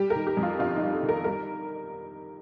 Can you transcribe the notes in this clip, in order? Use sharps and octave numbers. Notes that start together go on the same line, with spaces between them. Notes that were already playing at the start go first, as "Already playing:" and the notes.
Already playing: G3 G4
A#4
D#3
G4
F2
F4
G1 F4
D#4
G3
A4
D#3
A#4
G3 A#4